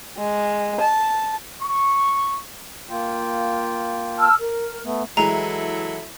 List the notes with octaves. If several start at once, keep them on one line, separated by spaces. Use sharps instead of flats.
G#3
A5
C#6
A#3 F4 G5
A5 E6 F6
A#4
A3 B3
E3 F#3 G#3 E4 A4 A#5